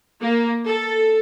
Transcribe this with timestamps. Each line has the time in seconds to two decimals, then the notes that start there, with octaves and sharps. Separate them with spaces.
0.21 A#3
0.65 A4